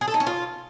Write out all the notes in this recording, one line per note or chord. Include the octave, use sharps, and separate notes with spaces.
G#4
A4
D#4
C#4
F4